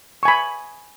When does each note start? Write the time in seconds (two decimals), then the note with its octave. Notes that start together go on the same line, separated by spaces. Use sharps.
0.23 C#6
0.25 G#5
0.28 B5